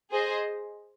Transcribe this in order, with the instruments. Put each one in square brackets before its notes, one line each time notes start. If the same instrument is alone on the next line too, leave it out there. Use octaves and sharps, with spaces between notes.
[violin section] G#4 C5 D#5